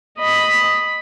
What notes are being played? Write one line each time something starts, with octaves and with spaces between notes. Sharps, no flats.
D#5 B5